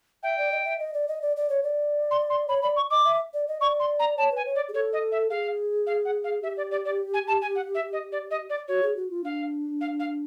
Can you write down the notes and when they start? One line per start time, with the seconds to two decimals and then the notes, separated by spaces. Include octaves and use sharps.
0.23 E5 G5
0.38 D5
0.52 D#5
0.65 E5
0.79 D#5
0.94 D5
1.08 D#5
1.22 D5
1.37 D5
1.49 C#5
1.63 D5
2.11 C6
2.30 C6
2.48 C#5 B5
2.62 D5 B5
2.76 C#6
2.91 D#5 D6
3.05 E5
3.34 D5
3.48 D#5
3.61 D5 C#6
3.80 C6
3.99 A#5
4.17 C#5 A5
4.32 B4 G#5
4.45 C#5
4.55 D5
4.69 G#4
4.73 A4 C#5
4.93 D#5
5.12 E5
5.30 G#4 F5
5.87 F5
6.05 F#5
6.24 F5
6.43 G4 E5
6.57 D5
6.71 D5
6.85 D5
7.14 G#5
7.27 A5
7.42 G#5
7.55 F#5
7.75 E5
7.93 D#5
8.12 D5
8.31 D#5
8.49 D5
8.68 F#4 C#5
8.83 G#4
8.96 F#4
9.10 F4
9.24 D4 F5
9.81 F5
10.00 F5